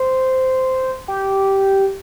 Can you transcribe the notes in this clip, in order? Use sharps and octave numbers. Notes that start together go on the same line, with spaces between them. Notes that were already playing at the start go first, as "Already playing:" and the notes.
Already playing: C5
G4